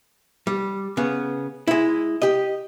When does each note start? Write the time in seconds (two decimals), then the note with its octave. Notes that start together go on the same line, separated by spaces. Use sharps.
0.47 G3
0.97 C#3 B3
1.67 G#3 E4
2.22 G4 D#5